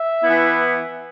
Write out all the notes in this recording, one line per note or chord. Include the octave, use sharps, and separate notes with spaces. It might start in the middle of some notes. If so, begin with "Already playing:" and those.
Already playing: E5
E3 B3 E4